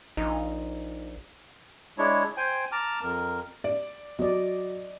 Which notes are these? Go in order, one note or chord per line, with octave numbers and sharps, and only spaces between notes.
A#1 D#4
G#3 D4 E4 C#5
C5 G5 G#5
A5 A#5 D6 F6
F2 A#4
D5
F#3 D5 D#5